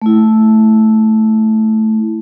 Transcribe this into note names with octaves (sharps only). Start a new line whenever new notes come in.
A3 E4